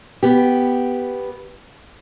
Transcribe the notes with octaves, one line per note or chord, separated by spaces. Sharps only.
B3 G4